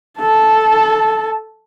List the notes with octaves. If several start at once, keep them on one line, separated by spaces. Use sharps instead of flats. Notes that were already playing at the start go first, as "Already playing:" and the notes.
A4 A5